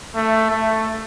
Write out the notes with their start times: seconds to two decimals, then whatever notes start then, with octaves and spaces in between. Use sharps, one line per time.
0.16 A3
0.50 A3